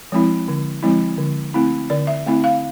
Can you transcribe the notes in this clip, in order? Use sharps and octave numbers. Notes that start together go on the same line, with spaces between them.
F3 G#3 C4 E4
D3
F3 G#3 C4 E4
D3
A3 C4 E4
D3 D5
E5
A3 C4 E4
F5